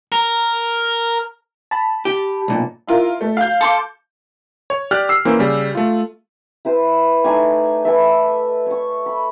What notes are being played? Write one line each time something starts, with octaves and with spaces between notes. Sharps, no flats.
A#4
A5 B5
G4
B1 A#2
E4 F4 A#4
A3
F5 G6
A4 C6 D6
C#5
G4 D5 F6 F#6
E6 C7
E3 A#3 C#4 C5
C#3 G3
A3 F4
E4 B4 C5
A3 D#4 D5 G#5
A4 B4 E5
C#5 C#6
B5